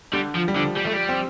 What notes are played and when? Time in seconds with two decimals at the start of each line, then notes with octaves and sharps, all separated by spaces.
0.13 D3 G3
0.35 F3
0.48 G3
0.55 D3 F3
0.76 G3
0.85 A3
0.93 G3
1.09 C4